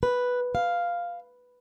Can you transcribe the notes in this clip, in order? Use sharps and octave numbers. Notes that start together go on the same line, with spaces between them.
B4
F5